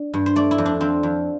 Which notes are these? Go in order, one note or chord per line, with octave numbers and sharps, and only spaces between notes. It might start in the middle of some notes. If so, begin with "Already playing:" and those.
Already playing: D4
G2
C5
A3 D5
E4
F2
D4
F2 C4
F2